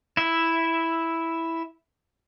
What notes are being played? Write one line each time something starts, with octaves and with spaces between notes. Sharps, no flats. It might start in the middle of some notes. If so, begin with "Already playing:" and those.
E4 E5